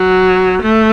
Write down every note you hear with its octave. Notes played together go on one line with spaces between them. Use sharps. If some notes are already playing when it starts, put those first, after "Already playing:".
Already playing: F#3
A3